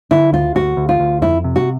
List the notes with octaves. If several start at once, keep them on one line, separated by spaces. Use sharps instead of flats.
D3 E4
D2 F4
D2 F#4
D2
F4
D2
F2 E4
C3
F#4